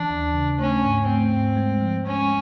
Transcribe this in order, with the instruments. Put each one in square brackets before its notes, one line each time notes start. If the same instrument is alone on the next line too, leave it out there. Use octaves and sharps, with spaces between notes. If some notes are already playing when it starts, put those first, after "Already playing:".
Already playing: [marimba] E3 [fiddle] D4
[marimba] D#2
C#3
[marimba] A3 [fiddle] C#4
[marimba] G#2
[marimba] A3 [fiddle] C4
[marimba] G#2
G#3
F3
[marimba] G#3 [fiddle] C#4